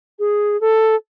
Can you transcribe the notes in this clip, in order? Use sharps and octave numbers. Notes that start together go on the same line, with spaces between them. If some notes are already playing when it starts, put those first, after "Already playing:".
G#4
A4